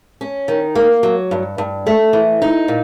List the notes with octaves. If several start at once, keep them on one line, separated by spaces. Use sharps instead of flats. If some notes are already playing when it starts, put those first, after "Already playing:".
C#4
D#3
A#3
F#3
G2
G2
A3
E3
D#4
A#2